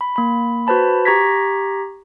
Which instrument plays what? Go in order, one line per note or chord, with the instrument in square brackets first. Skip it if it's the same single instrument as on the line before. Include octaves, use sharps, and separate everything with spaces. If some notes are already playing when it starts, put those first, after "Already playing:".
[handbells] B5
A#3 B5
F#4 B4 C5 A5 B5
G4 A#5 C#6 G#6 A#6 B6